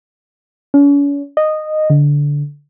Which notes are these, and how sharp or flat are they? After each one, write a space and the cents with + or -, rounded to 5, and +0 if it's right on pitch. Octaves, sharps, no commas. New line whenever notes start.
C#4 +40
D#5 -10
D3 -15